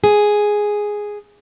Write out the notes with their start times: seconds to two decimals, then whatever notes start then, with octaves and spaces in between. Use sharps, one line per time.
0.04 G#4